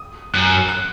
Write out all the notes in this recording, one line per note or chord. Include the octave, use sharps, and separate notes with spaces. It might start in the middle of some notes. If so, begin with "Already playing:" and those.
Already playing: D#6
F#2 F#6
F#6